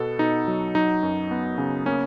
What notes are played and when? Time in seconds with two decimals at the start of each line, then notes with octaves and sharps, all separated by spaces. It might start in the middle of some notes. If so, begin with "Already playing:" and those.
Already playing: B2 B3 A4
0.19 B2 D#4
0.47 F#3
0.75 F#3 D#4
1.03 F#2
1.31 B3
1.58 C#3
1.86 A#3 C#4